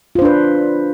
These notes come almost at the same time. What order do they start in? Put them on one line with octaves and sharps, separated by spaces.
F4 C5 D4 B4